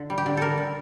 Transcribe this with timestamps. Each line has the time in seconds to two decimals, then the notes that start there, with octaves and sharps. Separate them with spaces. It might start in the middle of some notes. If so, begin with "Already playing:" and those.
Already playing: D3
0.10 G3
0.18 G4
0.26 D3
0.37 G3 A4 A#4
0.58 D3